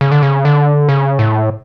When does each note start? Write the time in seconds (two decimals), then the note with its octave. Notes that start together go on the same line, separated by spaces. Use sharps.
0.01 C#3
0.12 D3
0.22 C#3
0.45 D3
0.89 C#3
1.19 A2